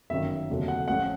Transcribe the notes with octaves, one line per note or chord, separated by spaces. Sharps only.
G1 F#2 D#3 E5
F1 D#2 D3 F#3
F#5
A1 A2 F3 F#5